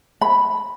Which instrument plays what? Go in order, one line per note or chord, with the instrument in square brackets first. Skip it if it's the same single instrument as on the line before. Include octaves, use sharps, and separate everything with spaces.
[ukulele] B5